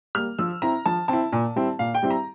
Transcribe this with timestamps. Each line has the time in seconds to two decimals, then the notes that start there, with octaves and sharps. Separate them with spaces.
0.15 G3 A#3 F6
0.39 F3 E6
0.62 C4 E4 A#5
0.86 F3 A5
1.08 C4 E4 A5
1.32 A#2
1.56 G3 C4 E4
1.79 A#2 F5
1.95 G5
2.03 G3 C4 E4
2.11 A#5